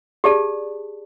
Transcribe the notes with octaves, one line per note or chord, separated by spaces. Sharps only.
G4 G#4 D5 A5